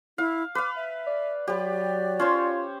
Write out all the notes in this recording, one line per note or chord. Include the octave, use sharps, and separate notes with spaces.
E4 F5
B4 F5 D6
E5
D5
F#3 G4 B4 D5
C#4 F4 C5 C#5